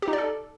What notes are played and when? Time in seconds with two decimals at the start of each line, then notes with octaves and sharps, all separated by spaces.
0.02 G4
0.08 D#4
0.13 D5
0.18 A4